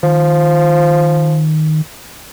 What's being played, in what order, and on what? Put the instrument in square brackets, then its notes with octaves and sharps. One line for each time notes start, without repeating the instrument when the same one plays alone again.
[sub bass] D#3 [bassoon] F3